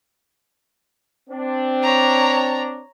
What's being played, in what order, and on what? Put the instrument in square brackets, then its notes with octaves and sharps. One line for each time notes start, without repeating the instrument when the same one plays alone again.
[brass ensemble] C4 D4
[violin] C#5 A#5